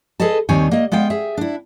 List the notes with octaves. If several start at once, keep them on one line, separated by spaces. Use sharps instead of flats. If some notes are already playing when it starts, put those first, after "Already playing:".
G#4 A4 B4 D#5 A5
D#2 D#3 G3 C4 C#5 G#5
A#3 D#5
G#3 B3 F5 G5
G#4 E5
D4 E4